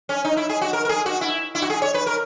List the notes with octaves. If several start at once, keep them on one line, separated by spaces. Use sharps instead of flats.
C#4
D#4
E4
G#4
F#4
A#4
A#4
G#4
F#4
E4
E4
F#4
G#4
C#5
B4
A#4